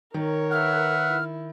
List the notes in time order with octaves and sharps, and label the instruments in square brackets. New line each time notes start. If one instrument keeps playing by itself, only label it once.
[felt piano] D#3 [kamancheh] A#4 C#5
[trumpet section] B4 E5 F#5 [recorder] F6
[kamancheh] E4